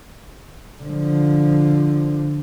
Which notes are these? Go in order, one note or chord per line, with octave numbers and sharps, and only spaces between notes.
D3 F3